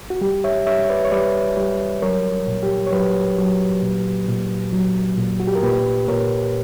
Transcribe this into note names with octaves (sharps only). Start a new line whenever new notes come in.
F#4
G3 G4
C#5 E5
G3 C#5 E5
C#5
B4 D5
C#5
G3 B4 D5
G3
F#3 A#4 C#5
A#2
G4
C#5
F#3 G4 B4
F#3
A#2
A#2
F#3
A#2
F#4
G4
A#4
A#2 G4 B4
A#2 A#4 C#5